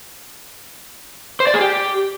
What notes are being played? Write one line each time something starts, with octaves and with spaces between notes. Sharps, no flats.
C5
D5
G#4
G4